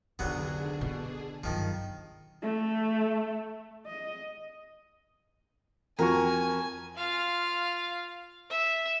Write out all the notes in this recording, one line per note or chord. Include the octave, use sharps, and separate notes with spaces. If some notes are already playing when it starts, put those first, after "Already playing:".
C2 F2 D3 D#3 F#3 B3 D4 G#4
B2 E4
G1 F#2 D#3 F3
A3
D#5
F2 F#4 A#4 G#5 C#6
F4 F5
E5